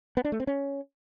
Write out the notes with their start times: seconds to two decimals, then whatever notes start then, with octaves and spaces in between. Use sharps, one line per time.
0.17 B3
0.25 D4
0.32 A3
0.40 C4
0.47 C#4